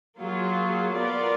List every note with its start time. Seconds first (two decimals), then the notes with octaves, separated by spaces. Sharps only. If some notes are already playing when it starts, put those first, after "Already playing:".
0.19 F#3 A#3 F4 G#4
0.96 B3 F4 A#4 D5